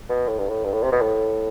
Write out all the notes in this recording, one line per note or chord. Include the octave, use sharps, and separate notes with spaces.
B2
A2
G2
A2
G2
A2
C3
B2
A2